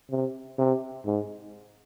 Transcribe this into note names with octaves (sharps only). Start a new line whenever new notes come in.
C3
C3
G#2